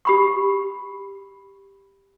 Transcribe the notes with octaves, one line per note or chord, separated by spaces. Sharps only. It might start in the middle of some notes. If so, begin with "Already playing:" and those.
G4 B5 C#6